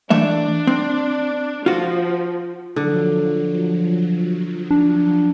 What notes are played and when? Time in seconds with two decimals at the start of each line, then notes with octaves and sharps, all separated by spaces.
0.10 E3 A3 D4 E5
0.67 C4
1.66 F3 F4 F#4
2.76 D3 F3 F#3
4.71 D4